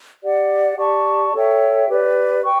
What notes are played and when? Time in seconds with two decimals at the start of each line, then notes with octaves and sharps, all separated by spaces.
0.22 G4 D5 F#5
0.77 G4 D5 A5 C#6
1.32 A4 C#5 E5 G5
1.89 G4 B4 D5
2.43 G5 C#6